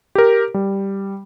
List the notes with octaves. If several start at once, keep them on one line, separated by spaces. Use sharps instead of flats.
G4 A#4
G3